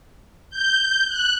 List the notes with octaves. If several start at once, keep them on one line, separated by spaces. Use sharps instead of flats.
G6
F#6